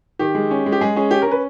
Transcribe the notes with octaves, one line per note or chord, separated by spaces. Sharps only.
D#3 G4
G#3
C#4
G#3
G4
G#3 G#4
C#4 G#4
C#4 G4
A#4
C#4 B4